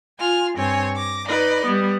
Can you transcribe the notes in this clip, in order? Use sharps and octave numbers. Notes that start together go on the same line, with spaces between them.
F4 G#5 F6
G2 C4 C#5 G#5
D6 A#6
D#4 B4 D5 D#5
G3 B3